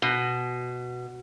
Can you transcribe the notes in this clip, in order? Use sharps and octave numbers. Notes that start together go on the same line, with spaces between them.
B2